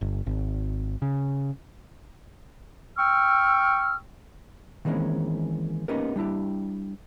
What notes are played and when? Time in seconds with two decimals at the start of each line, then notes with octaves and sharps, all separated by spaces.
0.01 G1
0.26 G#1
1.02 C#3
2.97 G5 C#6 E6 F6
4.85 D#3 E3 G#3 A#3 C4 C#4
5.88 A#3 B3 C#4 D#4 G4 A#4
6.16 G3 D4 E4 G4